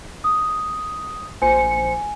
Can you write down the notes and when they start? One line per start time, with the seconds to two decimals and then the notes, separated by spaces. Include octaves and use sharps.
0.24 D#6
1.42 A#1 C5 G#5 C#7